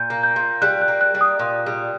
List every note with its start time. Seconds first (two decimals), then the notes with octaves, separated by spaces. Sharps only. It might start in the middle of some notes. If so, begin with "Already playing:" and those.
Already playing: A#2 G6
0.10 A#3
0.23 G6
0.36 A#2
0.62 G3 F#6
0.82 F#6
0.88 A#3
1.01 F#6
1.15 G3
1.21 D#6
1.39 A#2
1.66 G3